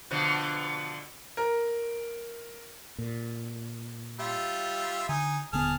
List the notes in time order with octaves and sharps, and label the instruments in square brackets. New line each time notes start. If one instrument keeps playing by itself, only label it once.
[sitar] B2 D3 F3
[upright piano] A#4
[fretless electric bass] A#2
[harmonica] G3 F4 E5
[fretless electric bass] D3 [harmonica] D#4 G#5
[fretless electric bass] D#1 D3 B3 [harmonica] G#4 A5 F6